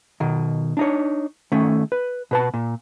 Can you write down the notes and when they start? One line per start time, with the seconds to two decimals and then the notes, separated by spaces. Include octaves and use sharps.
0.20 B2 D#3
0.77 D4 D#4 C#5
1.52 D#3 A3 C#4
1.92 B4
2.31 B2 B4 A5
2.54 A#2